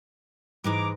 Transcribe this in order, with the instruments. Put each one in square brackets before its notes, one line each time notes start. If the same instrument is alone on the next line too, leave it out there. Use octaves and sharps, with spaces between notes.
[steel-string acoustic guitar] G#2 E3 G#3 [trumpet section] A#5 D6